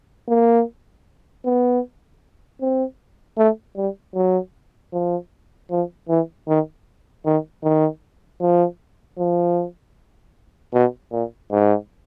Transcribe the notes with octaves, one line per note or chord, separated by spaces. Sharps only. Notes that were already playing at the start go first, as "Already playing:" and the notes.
A#3
B3
C4
A3
G3
F#3
F3
F3
E3
D#3
D#3
D#3
F3
F3
B2
A#2
G#2